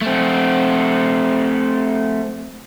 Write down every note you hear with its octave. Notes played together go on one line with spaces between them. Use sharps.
A3 C4